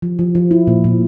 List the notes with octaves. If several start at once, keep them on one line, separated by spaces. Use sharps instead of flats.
F3
F3
F3
E4
A#2
A#2